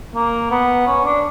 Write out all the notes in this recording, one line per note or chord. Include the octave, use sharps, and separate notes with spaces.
A#3
B3
C#4
D4